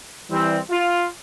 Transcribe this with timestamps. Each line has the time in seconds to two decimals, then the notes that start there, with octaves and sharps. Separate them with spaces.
0.31 E3 G3 C4
0.71 F4